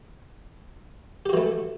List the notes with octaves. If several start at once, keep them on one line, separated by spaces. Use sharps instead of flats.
E3 A3 F#4 G4